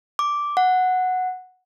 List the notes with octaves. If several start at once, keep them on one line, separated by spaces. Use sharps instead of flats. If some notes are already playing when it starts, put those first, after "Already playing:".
D6
F#5